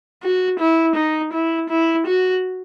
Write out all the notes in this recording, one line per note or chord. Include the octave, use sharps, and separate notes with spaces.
F#4
E4
D#4
E4
E4
F#4